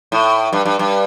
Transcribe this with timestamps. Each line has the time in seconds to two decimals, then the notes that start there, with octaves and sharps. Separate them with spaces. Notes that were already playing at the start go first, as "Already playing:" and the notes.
0.12 A2
0.53 G2
0.65 G2
0.79 G2